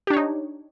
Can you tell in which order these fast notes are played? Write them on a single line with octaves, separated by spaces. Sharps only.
G4 D4 C#5 D#4